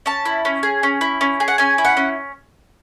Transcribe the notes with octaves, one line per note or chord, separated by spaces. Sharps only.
C#4 A5
E4
C#4
G#4
C#4
E4
C#4
G#4
F#5
C#4 G#5
E4
F#5
C#4